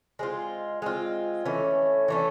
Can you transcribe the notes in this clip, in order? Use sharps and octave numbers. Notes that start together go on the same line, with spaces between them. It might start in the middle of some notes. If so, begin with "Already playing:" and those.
G#3 C4 F4
G#3 C4 F4
E3 A3 C#4
E3 A3 C#4